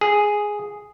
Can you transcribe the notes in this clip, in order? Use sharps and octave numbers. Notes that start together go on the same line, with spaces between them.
G#4